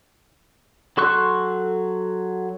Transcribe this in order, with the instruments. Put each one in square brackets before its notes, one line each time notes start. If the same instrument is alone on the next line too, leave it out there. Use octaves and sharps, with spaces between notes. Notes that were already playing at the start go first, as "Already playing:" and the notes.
[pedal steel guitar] F#3 A4 C6 C#6 F#6